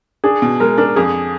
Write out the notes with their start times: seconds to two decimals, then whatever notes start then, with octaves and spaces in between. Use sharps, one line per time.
0.24 D4 G#4
0.42 B2
0.60 G#3 A#4
0.78 D4 A#4
0.96 F2 G#4